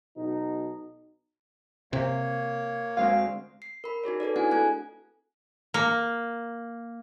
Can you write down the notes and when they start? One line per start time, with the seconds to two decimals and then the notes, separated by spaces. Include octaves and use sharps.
0.17 B1 B2 D#4
1.93 C3 A#3 C#5
2.97 D2 G#3 C4 F5
3.62 C7
3.84 A#4 B5
4.04 D#4 F#4 G#4 C#5
4.20 G#4 A4 B4 D5
4.36 C4 D4 E4 F#4 F#5 G#5
4.51 A3 A4 G#5 F#6 G#6
5.74 A#3